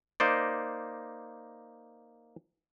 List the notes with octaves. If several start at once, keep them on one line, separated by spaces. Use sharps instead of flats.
A#3 D#4 C5 D5